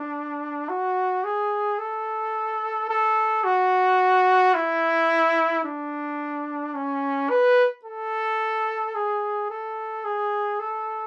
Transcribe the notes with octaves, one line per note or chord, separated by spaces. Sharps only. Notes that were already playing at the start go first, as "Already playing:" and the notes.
Already playing: D4
F#4
G#4
A4
A4
F#4
E4
D4
C#4
B4
A4
G#4
A4
G#4
A4